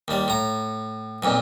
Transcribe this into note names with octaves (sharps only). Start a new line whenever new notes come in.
D#2 G3
A2 A#5
B1 F2 A#2